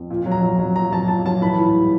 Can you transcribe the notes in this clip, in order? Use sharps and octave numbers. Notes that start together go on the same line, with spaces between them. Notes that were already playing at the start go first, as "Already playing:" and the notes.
Already playing: F2
A#2
F#3
A#5
F#3
F#3
A#2 A#5
F#3 A5
A#2 A5
F#3 A5
E3 B5
A2
G3